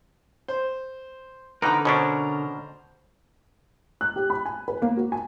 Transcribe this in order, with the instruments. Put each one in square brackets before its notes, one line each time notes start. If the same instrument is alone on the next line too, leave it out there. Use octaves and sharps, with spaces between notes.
[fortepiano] C5
[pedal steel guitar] D3 A#4 [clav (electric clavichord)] E3 F3 D#4 [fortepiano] B4 F#5 A#5
[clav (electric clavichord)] B2 C#4 D4 [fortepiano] C5 A#5
[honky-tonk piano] F#6
G4
B5
G#5
B4
A#3
F#4
G#5